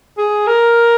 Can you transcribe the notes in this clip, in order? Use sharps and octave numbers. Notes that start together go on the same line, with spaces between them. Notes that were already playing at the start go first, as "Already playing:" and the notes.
G#4
A#4